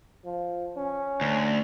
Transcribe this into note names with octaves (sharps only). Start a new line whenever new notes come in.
F3
C#4
D2